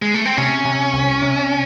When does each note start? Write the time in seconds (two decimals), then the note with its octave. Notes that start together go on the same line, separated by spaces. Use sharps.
0.02 G#3
0.14 A3
0.25 C4
0.37 C3 C#4
0.65 C3
0.93 C2
1.22 C3